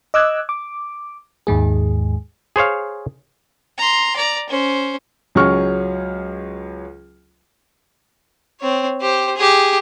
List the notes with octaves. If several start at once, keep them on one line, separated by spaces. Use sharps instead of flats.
D#5 D6 E6 F#6 G#6
D6
D#2 G#2 G#3 G#4
G#4 C5 C#5 F5
A#5 C6
D5 A#5
C#4 C5
C#2 F#3 G#4 C#6 F6
C4 C#5
G4 C5
G4 G#4